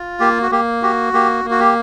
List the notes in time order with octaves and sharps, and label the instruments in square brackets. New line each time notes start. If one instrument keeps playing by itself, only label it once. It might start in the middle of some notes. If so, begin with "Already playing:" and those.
Already playing: [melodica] F4
A#3 G4
F#4
A#3 G4
F#4 G4
A#3 G4
A#3
F#4
G4